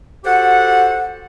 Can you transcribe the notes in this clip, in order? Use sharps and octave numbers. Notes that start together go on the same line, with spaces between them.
F#4 G4 A4 C5 F#5